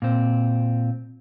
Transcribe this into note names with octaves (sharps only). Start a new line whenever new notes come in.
A#2 C4